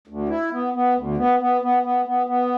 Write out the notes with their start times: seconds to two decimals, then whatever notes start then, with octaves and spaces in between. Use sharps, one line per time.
0.07 D2
0.29 E4
0.52 B3
0.74 B3
0.95 D2
1.17 B3
1.39 B3
1.61 B3
1.83 B3
2.05 B3
2.26 B3